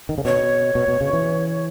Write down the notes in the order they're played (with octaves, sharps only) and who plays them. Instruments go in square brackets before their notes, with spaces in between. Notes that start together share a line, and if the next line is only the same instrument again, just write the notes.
[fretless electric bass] D#3
C#3
[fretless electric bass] B2 [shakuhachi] C#5
[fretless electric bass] B2
B2
C#3
E3